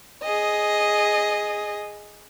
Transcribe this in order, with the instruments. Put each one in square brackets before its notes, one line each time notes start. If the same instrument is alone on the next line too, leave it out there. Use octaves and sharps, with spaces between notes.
[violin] G#4 D#5